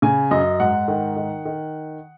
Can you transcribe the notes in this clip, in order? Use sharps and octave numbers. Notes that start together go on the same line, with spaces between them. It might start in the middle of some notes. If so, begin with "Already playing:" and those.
C#3 G#5
F#2 D#5
G#2 F#5
D#3
D#3
D#3